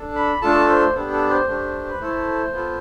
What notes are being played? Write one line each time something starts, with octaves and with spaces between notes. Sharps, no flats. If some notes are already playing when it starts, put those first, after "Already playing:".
Already playing: D4 A4
B5
A3 D4 F4 A4 A5
C5
B3 D4 G4 A4
A4
C5
A3 D4 G4
B4
A3 E4 A4 C5
B3 F4 A4